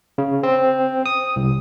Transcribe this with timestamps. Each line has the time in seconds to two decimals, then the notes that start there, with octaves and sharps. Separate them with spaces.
0.18 C#3
0.43 C4
1.06 D#6
1.36 C2